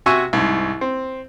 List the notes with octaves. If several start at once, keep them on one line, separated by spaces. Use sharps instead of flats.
C3 F#4 E5 G#5 C#6
C2 G#2
C4